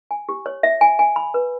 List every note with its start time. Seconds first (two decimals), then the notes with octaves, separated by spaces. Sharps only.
0.11 G#5
0.29 G4
0.46 C#5
0.63 E5
0.81 G#5
0.99 G#5
1.16 B5
1.34 B4